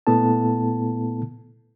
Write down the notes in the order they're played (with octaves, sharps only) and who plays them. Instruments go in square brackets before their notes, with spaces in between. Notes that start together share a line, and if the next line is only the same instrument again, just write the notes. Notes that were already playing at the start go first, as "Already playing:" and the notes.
[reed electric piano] A#2 A3 B3 E4 A4 A5